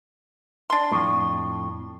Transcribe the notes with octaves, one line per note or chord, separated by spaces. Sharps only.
D4 C6
F2 A2